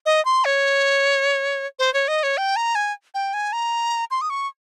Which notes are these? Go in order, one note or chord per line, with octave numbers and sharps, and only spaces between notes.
D#5
C6
C#5
C5
C#5
D#5
C#5
G5
A#5
G#5
G5
G#5
A#5
C6
D#6
C#6